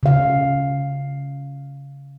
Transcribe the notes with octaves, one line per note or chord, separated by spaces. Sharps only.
C#3 F5